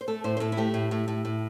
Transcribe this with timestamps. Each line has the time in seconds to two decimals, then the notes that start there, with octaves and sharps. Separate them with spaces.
0.01 C5
0.08 A3 A4
0.24 A2 C5
0.37 C5
0.40 A2 A4
0.52 E4
0.57 A3 G4
0.74 A2
0.91 A2
1.08 A2
1.25 A2